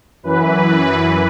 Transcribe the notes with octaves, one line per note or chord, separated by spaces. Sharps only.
F#2 E3 B4